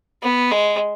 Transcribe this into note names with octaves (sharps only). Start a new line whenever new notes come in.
B3
G#3